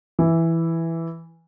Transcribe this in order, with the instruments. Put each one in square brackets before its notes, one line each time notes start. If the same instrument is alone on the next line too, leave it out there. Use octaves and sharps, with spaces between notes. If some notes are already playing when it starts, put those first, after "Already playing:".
[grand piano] E3